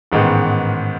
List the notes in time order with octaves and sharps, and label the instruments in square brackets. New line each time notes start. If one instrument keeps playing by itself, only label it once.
[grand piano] A1 G#2 D#3 G#3 B3